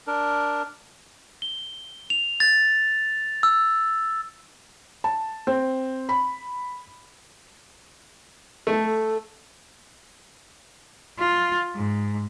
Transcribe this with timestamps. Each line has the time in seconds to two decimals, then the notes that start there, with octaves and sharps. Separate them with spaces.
0.07 D4 A#4
1.42 G7
2.10 F7
2.40 A6
3.43 E6
5.04 A5
5.47 C4
6.09 B5
8.67 A3
8.84 A4
11.19 F4
11.76 G#2